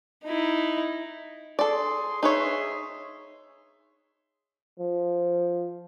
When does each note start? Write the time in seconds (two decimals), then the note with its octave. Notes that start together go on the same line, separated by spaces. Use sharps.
0.24 D#4 E4
1.59 G#4 A4 D5 C6
2.23 D#4 G#4 B4 C#5 E5 C6
4.79 F3